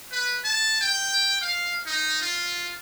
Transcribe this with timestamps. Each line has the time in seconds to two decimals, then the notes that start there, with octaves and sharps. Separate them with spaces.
0.12 B4
0.44 A5
0.81 G5
1.41 F5
1.86 D#4
2.22 F4